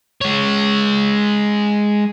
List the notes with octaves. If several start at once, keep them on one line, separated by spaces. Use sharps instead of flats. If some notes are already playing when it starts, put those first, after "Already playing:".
G#3 C#5